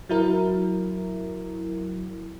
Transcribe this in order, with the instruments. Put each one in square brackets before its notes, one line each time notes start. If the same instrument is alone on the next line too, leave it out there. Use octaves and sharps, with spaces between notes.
[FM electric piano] F#3 E4 A#4